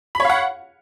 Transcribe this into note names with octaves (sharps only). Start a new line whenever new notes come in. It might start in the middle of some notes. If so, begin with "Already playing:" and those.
C#5 F5 F#5 B5